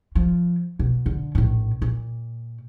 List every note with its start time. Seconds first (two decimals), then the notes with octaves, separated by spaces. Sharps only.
0.15 F3
0.79 B2
1.06 D3
1.35 A#1 A2
1.82 A#2